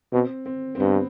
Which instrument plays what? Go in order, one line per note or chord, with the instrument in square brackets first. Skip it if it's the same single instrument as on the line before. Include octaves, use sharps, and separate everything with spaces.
[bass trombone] B2 [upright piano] C4
[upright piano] C4
C4
[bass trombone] G2 [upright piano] B3